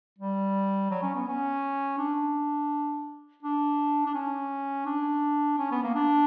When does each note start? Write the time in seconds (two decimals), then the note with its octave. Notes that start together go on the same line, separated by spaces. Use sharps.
0.18 G3
0.91 F#3
1.03 C#4
1.15 B3
1.27 C#4
1.98 D4
3.43 D4
4.06 D4
4.15 C#4
4.86 D4
5.58 C#4
5.71 B3
5.83 A#3
5.94 D4